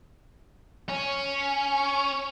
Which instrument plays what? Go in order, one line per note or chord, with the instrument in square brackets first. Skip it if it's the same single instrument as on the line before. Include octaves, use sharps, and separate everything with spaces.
[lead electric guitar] C#4